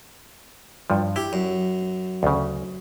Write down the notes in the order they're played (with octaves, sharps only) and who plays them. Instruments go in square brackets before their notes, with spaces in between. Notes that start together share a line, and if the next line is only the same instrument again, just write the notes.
[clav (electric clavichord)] G2 F3
[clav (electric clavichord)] E4 [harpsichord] G4
[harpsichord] F#2
[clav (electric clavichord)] D2 C#3